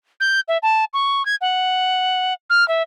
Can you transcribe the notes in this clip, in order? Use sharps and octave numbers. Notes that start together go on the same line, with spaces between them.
G6
E5
A5
C#6
G#6
F#5
F6
E5